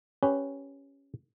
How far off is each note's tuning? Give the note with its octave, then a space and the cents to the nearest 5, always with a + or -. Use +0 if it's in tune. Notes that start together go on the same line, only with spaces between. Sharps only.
C#4 +0 G4 +15 B4 +5